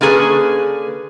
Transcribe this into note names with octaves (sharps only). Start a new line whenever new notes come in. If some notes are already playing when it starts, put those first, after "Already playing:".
D3 A#3 C#4 G#4 B4